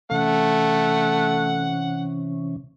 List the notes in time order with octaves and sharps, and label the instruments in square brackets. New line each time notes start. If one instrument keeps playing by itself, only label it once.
[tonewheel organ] C3 E3 C#4 [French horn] A3 [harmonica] F#5